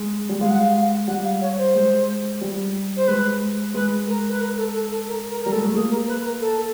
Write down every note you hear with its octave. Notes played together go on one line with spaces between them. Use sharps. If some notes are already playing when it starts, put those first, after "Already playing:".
Already playing: G#3
G3
G#3 F5
F#5
F5
G3 F#5
F5
C#5
C5
G#3
G3
C5
G#3 B4
G#3 B4
A#4
B4
A#4
A4
A4
A4
A#4
A#4
G3 A#4
A4
G#3
A3
A#3 G#4
A#4
B4
A#4
A4